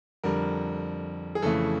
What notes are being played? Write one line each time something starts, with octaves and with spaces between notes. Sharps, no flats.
F2 D3 G3 A#4
G#4
F2 C#3 E3 A3 A4